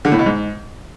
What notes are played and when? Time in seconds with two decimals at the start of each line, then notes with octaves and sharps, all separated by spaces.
0.05 D3
0.12 A2
0.19 B2
0.26 G#2